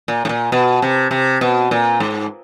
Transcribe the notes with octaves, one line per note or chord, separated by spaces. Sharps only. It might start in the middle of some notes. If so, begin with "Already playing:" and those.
A#2
A2
A#2
B2
C3
C3
B2
A#2
G#2